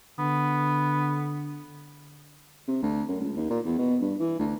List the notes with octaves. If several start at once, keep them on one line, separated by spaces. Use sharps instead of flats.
D3 B3
C3
D2
F#2
C#2
D#2
A#2
E2
B2
G2
E3
D2